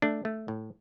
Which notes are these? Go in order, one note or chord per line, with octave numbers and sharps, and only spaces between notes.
A3 D4
A3
A2